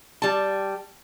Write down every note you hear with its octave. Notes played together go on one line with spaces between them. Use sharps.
G3 A5